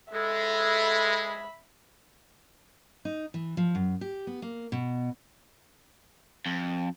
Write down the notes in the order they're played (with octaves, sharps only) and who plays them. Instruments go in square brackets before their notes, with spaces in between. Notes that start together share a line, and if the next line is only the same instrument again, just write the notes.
[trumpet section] G#3 [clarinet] A4 [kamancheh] E5 B5
[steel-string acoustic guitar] D#4
E3
F3
F#2
G4
B3
A#3
B2
[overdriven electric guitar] F2